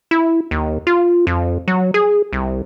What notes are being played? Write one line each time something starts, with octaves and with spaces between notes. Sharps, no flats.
E4
D#2
F4
F2
F#3
G#4
C2